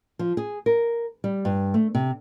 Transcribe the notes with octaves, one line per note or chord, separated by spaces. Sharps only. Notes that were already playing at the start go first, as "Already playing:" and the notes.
F3
G#4
A#4
G3
G2
A3
C3